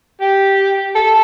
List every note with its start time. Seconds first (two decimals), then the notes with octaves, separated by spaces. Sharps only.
0.21 G4
0.95 A4